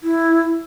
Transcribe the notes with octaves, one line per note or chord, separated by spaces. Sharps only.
E4